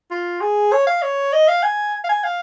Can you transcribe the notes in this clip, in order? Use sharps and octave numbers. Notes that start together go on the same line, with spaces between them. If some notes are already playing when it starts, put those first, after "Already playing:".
F4
G#4
C#5
F5
C#5
D#5
F5
G#5
F5
G#5
F5